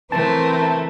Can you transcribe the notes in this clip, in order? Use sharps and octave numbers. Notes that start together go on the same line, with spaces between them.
E3 A3 C4 A#4 B4 A5